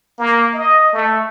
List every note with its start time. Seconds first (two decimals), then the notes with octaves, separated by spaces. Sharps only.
0.19 A#3
0.54 D#5
0.93 A3